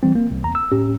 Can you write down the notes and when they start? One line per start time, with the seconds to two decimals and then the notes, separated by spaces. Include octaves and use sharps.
0.03 E3 G3 C4
0.15 A#3
0.31 C2
0.44 E2 A#5
0.55 E6
0.72 A2 C#4 G4